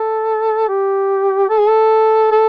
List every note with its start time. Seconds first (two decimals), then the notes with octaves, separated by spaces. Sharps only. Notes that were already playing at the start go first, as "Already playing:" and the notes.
Already playing: A4
0.68 G4
1.49 A4
1.59 G#4
1.68 A4
2.32 A4